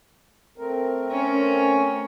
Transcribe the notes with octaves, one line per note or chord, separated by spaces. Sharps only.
A3 C4 A#4
C#4